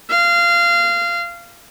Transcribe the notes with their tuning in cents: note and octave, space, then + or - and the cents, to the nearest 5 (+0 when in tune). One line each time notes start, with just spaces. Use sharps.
F5 -20